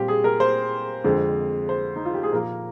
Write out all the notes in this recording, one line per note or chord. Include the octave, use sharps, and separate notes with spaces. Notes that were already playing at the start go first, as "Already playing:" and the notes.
Already playing: A#2 G3 C4 G4
G#4
A#4
C5
F2 D3 G#3 C4
C5
D#4
F4
G4
G#4
A#2 F3 A#3 A#4